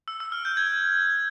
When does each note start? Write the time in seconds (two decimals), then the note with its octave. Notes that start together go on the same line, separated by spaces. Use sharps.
0.08 E6
0.20 E6
0.32 F6
0.45 G6
0.57 G#6